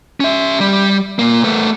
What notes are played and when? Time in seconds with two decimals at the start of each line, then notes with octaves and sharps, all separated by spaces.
0.20 C#4 E5
0.60 G3
1.19 A#2 A#3
1.44 A3 B3